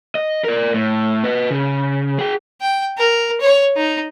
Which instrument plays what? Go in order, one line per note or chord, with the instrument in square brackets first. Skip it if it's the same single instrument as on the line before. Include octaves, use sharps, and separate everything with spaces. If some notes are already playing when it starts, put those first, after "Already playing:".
[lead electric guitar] D#5
A#4 D5
A2
B4 D#5
C#3
G#4 G5
[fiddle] G5
A#4
C#5
D#4